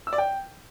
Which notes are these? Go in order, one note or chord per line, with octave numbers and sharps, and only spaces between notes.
E6
D5
G5